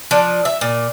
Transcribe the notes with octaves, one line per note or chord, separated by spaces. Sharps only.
F3 D4
E5
A#2